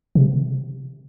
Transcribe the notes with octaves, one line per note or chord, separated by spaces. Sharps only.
C3